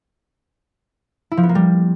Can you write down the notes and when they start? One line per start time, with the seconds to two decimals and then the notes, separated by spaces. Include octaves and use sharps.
1.31 E4
1.37 F3
1.43 B3
1.49 A#3
1.55 G3